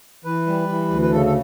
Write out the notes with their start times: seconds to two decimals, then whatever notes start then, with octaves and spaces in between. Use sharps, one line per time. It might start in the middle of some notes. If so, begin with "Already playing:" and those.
0.25 E3 B4
0.47 G3
0.69 E3
0.89 D2
1.02 B4
1.11 C#3 A4
1.25 A4